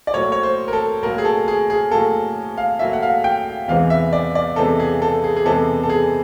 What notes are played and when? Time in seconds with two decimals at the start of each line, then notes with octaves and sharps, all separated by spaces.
0.07 D5
0.14 A2 F#3 A#3 C#5
0.32 C#5
0.43 C5
0.68 A#4
0.73 A4
1.03 A2 F#3 A#3 A#4
1.18 G#4
1.25 A4
1.48 G#4
1.70 G#4
1.91 A2 F#3 A#3 A4
2.57 F5
2.79 A2 F#3 A#3 E5
2.93 F#5
3.03 F5
3.24 G5
3.68 E2 C3 E3 G#3 B3 F5
3.90 E5
4.13 D5
4.35 D5
4.56 E2 C3 E3 G#3 B3 A4
4.80 G#4
5.02 A4
5.24 G#4
5.37 G#4
5.45 E2 C3 E3 G#3 B3 A4
5.83 A4
5.90 G#4